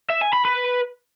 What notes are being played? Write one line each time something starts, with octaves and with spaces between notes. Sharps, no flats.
E5
G#5
B5
B4